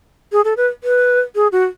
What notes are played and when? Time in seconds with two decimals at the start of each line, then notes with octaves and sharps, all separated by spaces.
0.32 G#4
0.45 A4
0.57 B4
0.84 B4
1.35 G#4
1.52 F#4